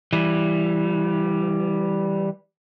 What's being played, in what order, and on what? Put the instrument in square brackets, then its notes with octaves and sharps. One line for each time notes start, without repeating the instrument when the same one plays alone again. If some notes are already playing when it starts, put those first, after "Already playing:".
[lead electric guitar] E3 G3